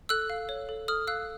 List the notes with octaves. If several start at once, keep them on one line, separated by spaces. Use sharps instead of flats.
A4 E6 F#6
F5
C#5
A4
A4 D#6 F6
F5 E6 F#6